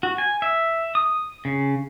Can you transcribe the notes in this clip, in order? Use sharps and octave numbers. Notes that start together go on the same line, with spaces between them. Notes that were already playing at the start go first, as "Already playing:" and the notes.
F#4
G#5
E5
D#6
C#3